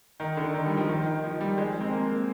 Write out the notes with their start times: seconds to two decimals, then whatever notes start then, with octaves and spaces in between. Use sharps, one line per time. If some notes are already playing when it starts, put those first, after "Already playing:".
0.20 D#3
0.37 D3
0.54 D#3
0.66 G3
0.77 F3
0.89 D#3
1.06 D#3
1.24 F3
1.41 G3
1.58 G#3
1.81 C4
1.93 A#3